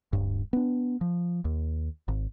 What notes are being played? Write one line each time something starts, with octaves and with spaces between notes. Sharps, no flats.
D1 G2
B3 D4
F3
D#2
G#1